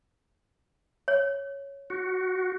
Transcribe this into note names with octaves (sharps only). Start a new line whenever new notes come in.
C#5
F#4